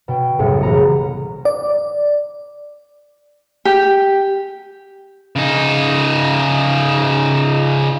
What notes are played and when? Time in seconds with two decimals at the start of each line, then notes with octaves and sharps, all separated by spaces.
0.08 B2 G5
0.39 F#1 C2 A2 C#7
0.61 A1 B3 A#5 C#7
1.45 D5
3.65 G4
5.36 C#3 D#4